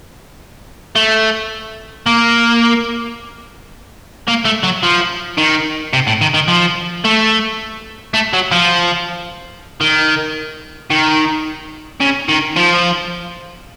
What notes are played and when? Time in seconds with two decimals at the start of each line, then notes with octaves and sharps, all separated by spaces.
0.96 A3
2.06 A#3
4.28 A#3
4.45 A3
4.64 F#3
4.83 F3
5.37 D#3
5.93 C3
6.07 A2
6.21 D#3
6.34 D#3
6.48 F3
7.04 A3
8.14 A3
8.33 F#3
8.52 F3
9.81 D#3
10.90 D#3
12.00 C#3
12.29 D#3
12.56 F3